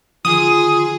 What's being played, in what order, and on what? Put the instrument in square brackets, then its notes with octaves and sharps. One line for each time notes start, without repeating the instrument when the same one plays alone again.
[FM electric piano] D3 D#3 F3 [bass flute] F4 [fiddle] G#4 [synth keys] D#6